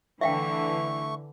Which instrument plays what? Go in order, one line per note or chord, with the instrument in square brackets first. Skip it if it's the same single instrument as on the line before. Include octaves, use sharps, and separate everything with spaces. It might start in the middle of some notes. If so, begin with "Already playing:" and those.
[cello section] D3 E3 [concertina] A3 C#6 [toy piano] E5 F5 G5